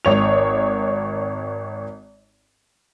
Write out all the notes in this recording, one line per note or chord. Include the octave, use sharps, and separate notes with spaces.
G#1 C#5 F7